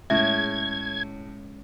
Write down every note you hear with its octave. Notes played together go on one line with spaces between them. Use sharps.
A2 G#3 C#4 E5 G#6